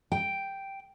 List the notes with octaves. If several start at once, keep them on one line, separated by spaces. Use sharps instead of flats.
G5